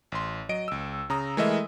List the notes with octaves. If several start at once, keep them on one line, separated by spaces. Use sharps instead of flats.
A1 C6
F#3 D#5 D7
C#2 E6
C#3 A#5 D#6
E3 G#3 A3 A#4 D#5 E5